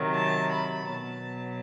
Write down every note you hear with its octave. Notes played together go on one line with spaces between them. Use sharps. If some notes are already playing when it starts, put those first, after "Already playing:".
Already playing: C3 D#3 F#3
A5
B5
B2 F#3 A5